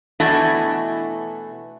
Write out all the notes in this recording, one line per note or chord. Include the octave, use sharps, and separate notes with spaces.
B2 E3 A3 D4 E4 F#4